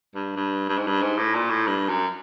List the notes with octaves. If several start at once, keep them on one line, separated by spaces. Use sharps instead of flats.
G2
G2
G2
G#2
G2
G#2
A2
A#2
A2
G2
F#2